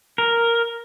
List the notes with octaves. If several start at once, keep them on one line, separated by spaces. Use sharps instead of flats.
A#4